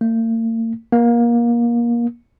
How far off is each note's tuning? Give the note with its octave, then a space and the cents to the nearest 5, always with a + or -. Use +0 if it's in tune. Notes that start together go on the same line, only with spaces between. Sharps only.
A#3 -45
A#3 +25